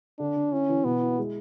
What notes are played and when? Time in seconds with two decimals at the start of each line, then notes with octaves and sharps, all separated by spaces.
0.19 D3 D4
0.36 D3
0.52 C#4 E4
0.69 E3
0.84 B2 B3
1.01 E4
1.18 G#3